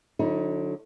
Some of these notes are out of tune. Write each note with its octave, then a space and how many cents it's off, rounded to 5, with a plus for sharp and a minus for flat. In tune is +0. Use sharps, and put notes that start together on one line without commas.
D3 +0 F#3 -40 D#4 +30